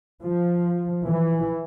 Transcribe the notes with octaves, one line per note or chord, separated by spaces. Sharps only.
F3
E3